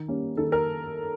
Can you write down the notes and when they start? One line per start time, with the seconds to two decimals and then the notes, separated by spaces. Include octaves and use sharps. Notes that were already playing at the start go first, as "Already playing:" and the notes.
Already playing: D#3
0.08 G3 A#3 C#4
0.37 D#3 A4
0.52 A#4